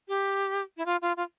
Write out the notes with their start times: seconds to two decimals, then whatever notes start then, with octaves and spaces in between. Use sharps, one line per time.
0.08 G4
0.77 E4
0.86 F4
1.02 F4
1.17 F4